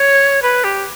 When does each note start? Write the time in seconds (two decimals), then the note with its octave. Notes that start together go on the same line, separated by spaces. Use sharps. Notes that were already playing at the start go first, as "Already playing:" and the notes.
Already playing: C#5
0.42 B4
0.64 G4